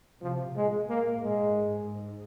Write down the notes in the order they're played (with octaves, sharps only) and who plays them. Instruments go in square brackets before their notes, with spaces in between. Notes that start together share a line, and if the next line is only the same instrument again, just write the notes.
[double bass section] C3 [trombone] F3
[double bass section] A#2 [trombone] G#3
[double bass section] A#2 [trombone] A#3
[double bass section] G#2 [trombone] G#3